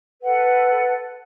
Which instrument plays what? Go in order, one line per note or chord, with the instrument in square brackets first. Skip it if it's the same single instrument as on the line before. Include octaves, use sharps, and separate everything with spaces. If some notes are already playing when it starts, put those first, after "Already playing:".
[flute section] A4 B4 F#5